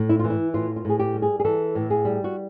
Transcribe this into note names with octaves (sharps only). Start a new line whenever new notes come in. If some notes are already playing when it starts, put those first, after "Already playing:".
Already playing: A2
E4
E3 F4
E4
A2 F4
F4
A2 G#4
G4
G3
G#4
G#4
E3 A4
A2
G#4
G3
F#4